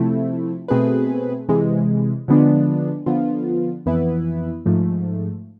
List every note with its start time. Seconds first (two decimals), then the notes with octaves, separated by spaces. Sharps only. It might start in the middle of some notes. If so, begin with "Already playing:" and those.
Already playing: C3 F3 A3 C4 E4
0.68 B2 A3 C4 G#4 B4
1.49 C3 E3 G#3
2.28 D3 F3 G#3 B3 D4
3.06 D3 F3 B3 F4
3.86 F2 E3 B3 E4 B4
4.66 G#2 F3 A3